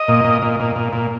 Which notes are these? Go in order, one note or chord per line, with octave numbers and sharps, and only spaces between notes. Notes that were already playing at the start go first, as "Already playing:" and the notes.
Already playing: D#5
A#2
A#2
A#2
A#2
A#2
A#2